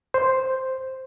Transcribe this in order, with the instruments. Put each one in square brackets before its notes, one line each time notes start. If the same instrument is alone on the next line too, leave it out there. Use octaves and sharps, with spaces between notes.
[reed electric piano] C5